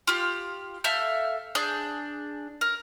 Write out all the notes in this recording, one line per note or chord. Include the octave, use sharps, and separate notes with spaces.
F4 G4
A4 E5 F5 G6
D4 G#4 G6
A#4